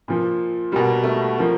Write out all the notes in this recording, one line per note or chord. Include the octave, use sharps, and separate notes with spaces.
A#2 F3
B2 G3 A#3
A3
F3 A#3